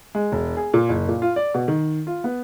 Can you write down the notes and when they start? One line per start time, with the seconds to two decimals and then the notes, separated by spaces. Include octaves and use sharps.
0.15 G#3
0.32 E1
0.57 G#4
0.74 A#2
0.89 F#1
1.08 A#2
1.22 F4
1.36 D5
1.54 B2
1.68 D#3
2.07 F4
2.24 B3